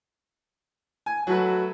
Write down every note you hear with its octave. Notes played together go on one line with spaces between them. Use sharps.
G#5
F#3 A3 F#4 B4